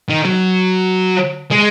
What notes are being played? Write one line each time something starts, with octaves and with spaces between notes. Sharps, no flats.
D#3
F#3
G#3